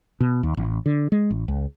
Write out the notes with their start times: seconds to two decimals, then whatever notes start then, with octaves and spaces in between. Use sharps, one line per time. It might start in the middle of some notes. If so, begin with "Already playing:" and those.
0.20 B2
0.43 D#2
0.57 A1
0.86 D3
1.12 G#3
1.31 A1
1.48 C#2